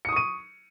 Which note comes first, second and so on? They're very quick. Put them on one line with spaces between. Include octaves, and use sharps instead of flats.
C#7 D#6 C#6 D#7